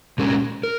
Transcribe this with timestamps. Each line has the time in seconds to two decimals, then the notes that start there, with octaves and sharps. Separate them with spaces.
0.18 A#2 G#3 C#4 G4 A#4
0.63 A#4